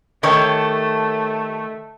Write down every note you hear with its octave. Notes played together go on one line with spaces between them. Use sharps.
D#3 A3 G4 A4 C#5